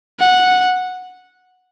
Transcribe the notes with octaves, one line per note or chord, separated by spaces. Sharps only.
F#5